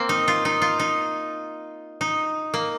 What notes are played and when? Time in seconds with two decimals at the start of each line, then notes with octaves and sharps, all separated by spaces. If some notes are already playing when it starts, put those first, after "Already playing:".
Already playing: A#3 C4
0.09 D#4
0.28 F4
0.45 D#4
0.62 F4
0.79 D#4
2.01 D#4
2.54 A#3